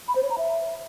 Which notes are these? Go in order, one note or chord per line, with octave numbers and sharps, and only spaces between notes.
B5
C5
C#5
A#5
E5